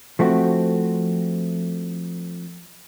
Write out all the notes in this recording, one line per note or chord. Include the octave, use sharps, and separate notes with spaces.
F3 A3 C4 F#4